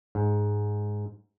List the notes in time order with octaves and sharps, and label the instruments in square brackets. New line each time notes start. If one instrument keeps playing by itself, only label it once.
[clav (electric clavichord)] G#2